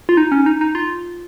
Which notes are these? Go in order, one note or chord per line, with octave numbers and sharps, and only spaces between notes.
F4
D#4
C#4
D#4
D#4
F4